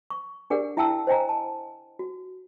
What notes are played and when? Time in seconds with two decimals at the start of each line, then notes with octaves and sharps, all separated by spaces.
0.10 C#6
0.50 D4 G4 G#4 A#4 D5 F#5
0.77 E4 E5 F#5 G5 A5 E6
1.07 C5 D#5 G5 G#5 A#5
1.29 A5
1.99 F#4